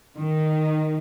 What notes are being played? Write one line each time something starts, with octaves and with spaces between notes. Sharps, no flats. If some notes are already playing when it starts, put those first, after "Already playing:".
D#3